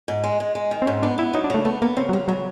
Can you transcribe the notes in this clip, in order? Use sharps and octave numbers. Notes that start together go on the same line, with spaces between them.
G#2
G#3
G#3
G#3
D#3
C4
G#2 C#4
B3 D4
B3 E4
F#3 D#4
D4
C#3 A3
A3 B3
A#3 B3
C#3 C4
F#3
C#3 G3
C#3 F#3